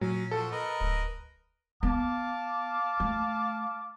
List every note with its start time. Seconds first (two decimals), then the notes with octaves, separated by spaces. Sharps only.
0.01 A#2 F#3 C#4
0.31 F3 F#4 A4
0.52 A#4 B4 D#5
0.80 D1
1.83 B3 F5 A5 D6
3.00 A3